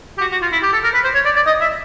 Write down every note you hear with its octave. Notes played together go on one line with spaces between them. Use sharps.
G4
F#4
F#4
F4
E4
G4
A4
A#4
B4
C5
C#5
D5
D5
D#5
E5